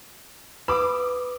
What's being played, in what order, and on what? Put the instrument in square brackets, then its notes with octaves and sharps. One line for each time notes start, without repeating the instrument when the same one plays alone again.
[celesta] B4 [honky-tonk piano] B5 D6 D#6